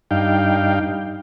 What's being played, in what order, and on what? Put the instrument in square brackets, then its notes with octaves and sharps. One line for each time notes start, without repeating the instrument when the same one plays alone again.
[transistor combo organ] G2 D#4 F5 G5